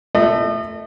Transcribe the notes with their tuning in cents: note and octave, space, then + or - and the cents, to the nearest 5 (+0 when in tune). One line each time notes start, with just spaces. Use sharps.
A3 +0 D#5 -35